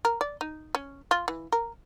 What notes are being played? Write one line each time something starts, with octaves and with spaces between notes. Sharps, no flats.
A#4
D5
D#4
C#4
F4
E3
A#4